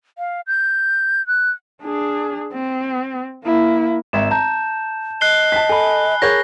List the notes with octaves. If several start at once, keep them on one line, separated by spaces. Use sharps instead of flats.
F5
G6
F#6
D4 G#4
C4
A#3 E4
G#1 E5 A#5 E7
A5 A#5 G6
D#5 F#6 C7 G7
A5 B6
A4 G#5 B5
G#4 A#4 C#5 G6 A#6